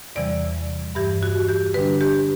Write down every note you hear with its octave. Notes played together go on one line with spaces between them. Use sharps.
E2 C3 E3 G3 D5
G2 E3 G3 G4
F#4
G4
D3 G3 D4 B4
G4